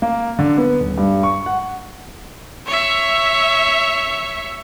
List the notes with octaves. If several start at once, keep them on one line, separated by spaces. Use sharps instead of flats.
A#3
D3
B3
D#1
G2
C#6
F#5
C#5 E5